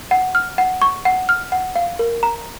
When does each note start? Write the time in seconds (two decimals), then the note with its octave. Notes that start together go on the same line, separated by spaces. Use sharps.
0.11 F#5
0.35 F6
0.58 F#5
0.82 C#6
1.05 F#5
1.29 F6
1.52 F#5
1.76 F5
1.99 A#4
2.23 A#5